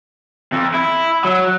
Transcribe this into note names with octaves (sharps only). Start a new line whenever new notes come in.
F2
E4
F#3